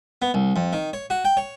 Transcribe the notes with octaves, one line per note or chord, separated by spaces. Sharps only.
B3
C2
F2
D#3
C#5
F#4
G5
C#5